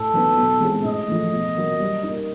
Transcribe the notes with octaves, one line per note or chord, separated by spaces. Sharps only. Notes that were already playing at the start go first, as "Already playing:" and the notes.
Already playing: A2 A4
F#3 B3 D#4
B2
G#3 C4 E4 G#4
A2 D#5
F3 A3
B2
F#3 A#3
G3
A#3 D#4